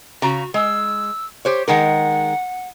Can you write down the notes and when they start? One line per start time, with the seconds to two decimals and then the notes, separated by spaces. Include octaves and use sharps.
0.22 C#3 F#4 A#5
0.54 G#3 E6
1.45 G4 C5 C#5
1.68 D#3 G#3 A#4 F#5